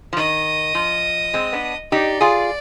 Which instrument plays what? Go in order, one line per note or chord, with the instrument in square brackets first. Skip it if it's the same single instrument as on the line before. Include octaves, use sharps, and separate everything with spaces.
[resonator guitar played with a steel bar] F3
[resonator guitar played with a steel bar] D#3 [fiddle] D#5
[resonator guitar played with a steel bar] F3
G#3 C4
B3 D4
[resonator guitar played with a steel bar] D#4 G4 [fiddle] D5
[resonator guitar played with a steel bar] F4 G#4